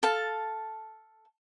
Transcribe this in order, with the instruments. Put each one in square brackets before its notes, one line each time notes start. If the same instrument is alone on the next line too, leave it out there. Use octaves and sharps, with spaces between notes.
[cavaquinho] A4 F5 A5